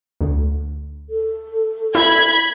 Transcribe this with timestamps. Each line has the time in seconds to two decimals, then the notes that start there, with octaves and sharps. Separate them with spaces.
0.21 D2
1.10 A4
1.95 E4 B5 G#6